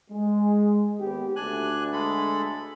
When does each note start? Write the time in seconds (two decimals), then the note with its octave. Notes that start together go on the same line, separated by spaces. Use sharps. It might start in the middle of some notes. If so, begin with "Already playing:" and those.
0.11 G#3
1.00 D#2 B3 G4
1.36 D2 D4 G#5 F#6
1.93 G#3 A4 B5